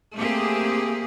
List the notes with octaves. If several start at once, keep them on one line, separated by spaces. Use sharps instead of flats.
A3 A#3 C4 G4 G#4